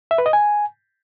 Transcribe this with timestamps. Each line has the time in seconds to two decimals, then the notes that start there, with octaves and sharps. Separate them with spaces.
0.11 E5
0.18 B4
0.26 D#5
0.33 G#5